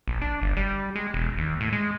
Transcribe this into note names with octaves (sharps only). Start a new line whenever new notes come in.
A#1
D4
G1
G3
G#3
E1
D#2
A2
G#3